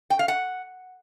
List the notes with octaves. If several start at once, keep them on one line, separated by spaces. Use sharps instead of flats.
G5
F5
F#5